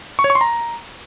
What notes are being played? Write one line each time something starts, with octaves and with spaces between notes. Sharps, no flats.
C#6
C#5
C#6
C6
A#5